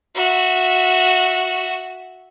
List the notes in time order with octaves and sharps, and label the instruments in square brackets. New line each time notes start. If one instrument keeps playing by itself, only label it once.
[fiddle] F#4 E5